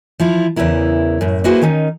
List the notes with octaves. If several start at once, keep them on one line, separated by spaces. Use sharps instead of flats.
F3 E4 F4
E2 C#3 E3 E4 A#4
F#2 A2
A#3 E4 F#4 G#4 B4 C5
D#3 C#4 D#4